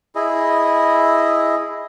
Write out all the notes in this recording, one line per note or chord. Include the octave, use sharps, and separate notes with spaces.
E4 G#4 D#5